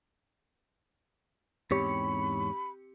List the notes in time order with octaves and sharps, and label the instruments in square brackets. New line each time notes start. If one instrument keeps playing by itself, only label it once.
[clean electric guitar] E2 G#2 C#5 [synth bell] C4 G4 C#7 [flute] B5